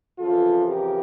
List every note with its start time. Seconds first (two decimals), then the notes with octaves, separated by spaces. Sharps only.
0.18 F2 C#3 E3 F4 A4
0.66 G4 A#4